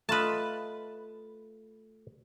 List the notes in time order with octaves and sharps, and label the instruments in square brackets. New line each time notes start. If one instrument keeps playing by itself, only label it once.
[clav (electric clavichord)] A3 F4 D#5 [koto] B4 A5